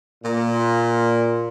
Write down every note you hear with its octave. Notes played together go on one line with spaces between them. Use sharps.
A#2